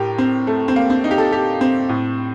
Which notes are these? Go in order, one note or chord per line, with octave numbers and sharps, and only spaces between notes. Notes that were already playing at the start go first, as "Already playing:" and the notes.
Already playing: A2 G4 A#4
C4
A3
C4
A#3
C4
D#4
G4
A4
G4
C4
A2